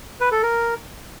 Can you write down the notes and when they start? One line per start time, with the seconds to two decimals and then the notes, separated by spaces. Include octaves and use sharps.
0.21 B4
0.32 A4
0.43 A#4